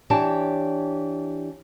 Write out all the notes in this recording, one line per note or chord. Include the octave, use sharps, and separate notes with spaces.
E3 D4 G4 C#5 A5